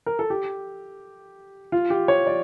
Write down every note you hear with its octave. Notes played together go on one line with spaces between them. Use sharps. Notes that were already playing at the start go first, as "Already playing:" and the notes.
A#4
A4
G4
F4
G4
C#5
D5